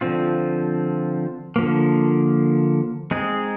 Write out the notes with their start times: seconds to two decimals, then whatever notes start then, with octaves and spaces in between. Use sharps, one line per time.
0.01 D3 F3 C4 F4
1.56 D3 F3 A#3
3.11 G#3 C4 D#4 G#4